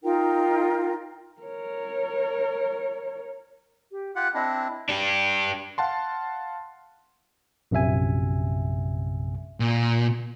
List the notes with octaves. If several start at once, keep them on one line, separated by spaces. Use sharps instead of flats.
D#4 F4 A#4 G5
A#4 C#5
G4
F4 G4 F#5 F#6
C4 D4 E4 D#5
D4 G4
F5 F#5 A5 C6
A#1 F#2 C3 E5 G#5
A#2